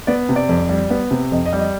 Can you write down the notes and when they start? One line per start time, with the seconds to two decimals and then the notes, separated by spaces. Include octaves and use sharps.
0.07 B3 D5
0.29 C3
0.36 D5
0.49 F2
0.69 G3
0.90 B3
1.11 C3
1.32 F2 D#5
1.46 D#5
1.53 G3
1.59 D#5